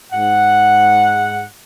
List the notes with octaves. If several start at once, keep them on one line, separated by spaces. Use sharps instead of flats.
G#2 F#5